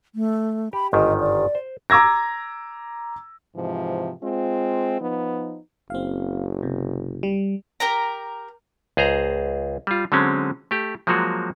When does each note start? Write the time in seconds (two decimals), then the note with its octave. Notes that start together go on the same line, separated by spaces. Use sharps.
0.15 A3
0.73 G4 B5
0.93 G1 G#2 D#3 D#5
1.20 D5
1.55 C5
1.90 A#5 D6 E6 G#6 A#6
3.56 G#2 C3 E3 F3
4.23 G#3 C4 F4
5.00 F3 B3 D#4
5.90 F#1 C4 F5
6.63 C3
7.23 G3
7.80 G4 A#4 A#5
8.97 C#2 G#4 C5 A#5
9.87 G3 F4
10.12 D3 F#3 G#3 C4 C#4
10.71 A3 G4
11.07 F3 F#3 G#3 A#3 F#4